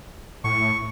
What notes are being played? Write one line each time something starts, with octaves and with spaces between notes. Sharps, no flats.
A2 C#6